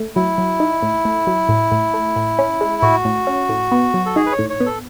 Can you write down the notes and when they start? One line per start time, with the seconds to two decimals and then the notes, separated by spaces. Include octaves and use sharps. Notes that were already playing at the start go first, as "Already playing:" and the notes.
Already playing: A3
0.16 F#3 E4
0.38 F#3
0.60 D#4
0.83 A2
1.05 A3
1.27 F#3
1.49 A2
1.72 A2
1.94 A3
2.16 A2
2.39 C#4
2.61 G#3
2.82 A2 F#4
3.05 A2
3.27 C#4
3.49 A2
3.72 B3
3.94 F#3
4.06 A4
4.16 D#4 G#4
4.26 B4
4.32 C#5
4.39 A2
4.50 C#5
4.60 B3
4.66 A4